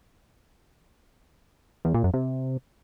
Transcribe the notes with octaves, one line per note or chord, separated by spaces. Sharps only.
E2
A#2
F#2
C3